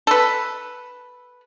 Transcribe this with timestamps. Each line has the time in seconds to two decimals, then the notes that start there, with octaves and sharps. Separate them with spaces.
0.07 A4 B4